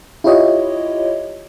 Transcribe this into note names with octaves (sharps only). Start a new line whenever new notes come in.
E4 F4 G4 C#5 D#5